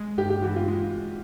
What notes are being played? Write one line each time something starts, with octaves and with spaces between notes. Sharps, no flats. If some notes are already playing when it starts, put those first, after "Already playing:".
Already playing: G#3
G2 G4
G4
E3 F#4
F4
G#3